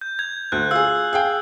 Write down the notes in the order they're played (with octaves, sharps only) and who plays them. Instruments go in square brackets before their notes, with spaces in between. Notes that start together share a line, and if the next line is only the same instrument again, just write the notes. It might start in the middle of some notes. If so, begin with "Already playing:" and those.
[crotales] G6
G#6
[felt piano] D2 [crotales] F#6
[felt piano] F4 G#4 [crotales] E6
[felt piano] G#4 F5 G5